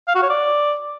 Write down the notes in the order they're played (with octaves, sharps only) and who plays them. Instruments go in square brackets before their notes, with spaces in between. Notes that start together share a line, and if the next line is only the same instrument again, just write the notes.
[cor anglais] F5
F#4
C#5
D5